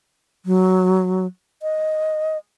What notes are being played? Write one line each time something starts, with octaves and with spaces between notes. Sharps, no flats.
F#3
D#5